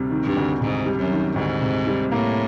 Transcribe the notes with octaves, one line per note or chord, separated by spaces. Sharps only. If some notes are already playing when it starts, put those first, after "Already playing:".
Already playing: D2 C3 G3
D#3
G2
D2
G#2 C3
G3
F#2
D#3
D2 G#2
C3
G3
A2 A#3